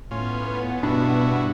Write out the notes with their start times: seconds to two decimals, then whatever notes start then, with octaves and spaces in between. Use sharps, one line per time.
0.11 A2 B3 C#4 F4
0.83 G2 B2 D4 E4 F#4